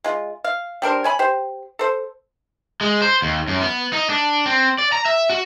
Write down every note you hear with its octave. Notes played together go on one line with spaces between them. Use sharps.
G#3 F4
F5
G3 D4 A#4 C5
C#5 G#5 B5
G4 C5
A4 C5
G#3
C5
D#2
F#2
B3
D#4
D4
C4
D5
A#5
E5
F#4